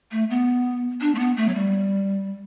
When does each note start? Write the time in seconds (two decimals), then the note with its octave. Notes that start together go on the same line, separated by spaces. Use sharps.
0.12 A3
0.30 B3
1.01 D4
1.15 A3
1.19 B3
1.37 A3
1.49 F#3
1.54 G3